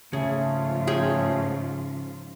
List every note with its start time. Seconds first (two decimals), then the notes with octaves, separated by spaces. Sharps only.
0.13 G#2 C#3 F3 A3 F4 G#4
0.87 C#4 G#4 G5